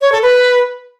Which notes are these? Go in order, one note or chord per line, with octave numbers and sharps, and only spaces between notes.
C#5
A4
B4